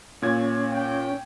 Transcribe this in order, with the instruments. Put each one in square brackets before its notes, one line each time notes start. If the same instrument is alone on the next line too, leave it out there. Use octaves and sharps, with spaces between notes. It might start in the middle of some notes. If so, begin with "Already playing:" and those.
[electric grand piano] A#2 G#6 [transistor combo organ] C#4
[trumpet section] G5